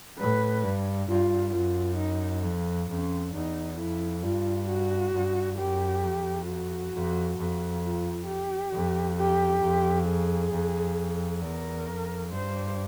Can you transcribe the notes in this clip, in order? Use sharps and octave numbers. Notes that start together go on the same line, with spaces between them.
A2 B4
G2
G2 F4
F#2 F4
D#4
F2
F2 C#4
E2 D#4
F2 E4
G2 F4
F#4
G2
F#2 G4
F2
F#4
F2
F2
F4
G4
F2
G4
F2
G#4
F2
E2 A#4
F2
G2 C5